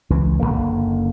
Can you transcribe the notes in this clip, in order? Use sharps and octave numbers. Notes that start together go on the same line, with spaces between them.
C#2 E3
F#1 F#2 D3 A#3